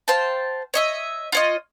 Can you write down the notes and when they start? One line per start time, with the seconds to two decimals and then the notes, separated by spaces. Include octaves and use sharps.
0.08 C5 F5 G5 A5
0.74 C#5 D#5 E5
1.32 F4 C#5 D#5